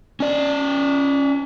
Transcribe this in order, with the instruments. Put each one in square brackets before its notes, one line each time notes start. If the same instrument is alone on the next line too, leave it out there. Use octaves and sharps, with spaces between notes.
[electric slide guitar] C#4 D5